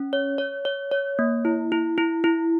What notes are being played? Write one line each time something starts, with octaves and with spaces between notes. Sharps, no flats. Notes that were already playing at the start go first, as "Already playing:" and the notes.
Already playing: C#4
C#5
C#5
C#5
C#5
A#3
E4
E4
E4
E4